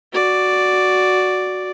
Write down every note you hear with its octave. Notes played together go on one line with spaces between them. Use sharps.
F#4 D5